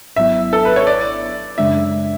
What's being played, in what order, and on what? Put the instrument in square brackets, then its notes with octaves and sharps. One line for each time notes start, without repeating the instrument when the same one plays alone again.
[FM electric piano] G#1 G#2 F#3 B3 E4 [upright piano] E5
[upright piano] A4
B4
C#5
D5
[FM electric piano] F#2 C#3 G#3 D4 [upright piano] E5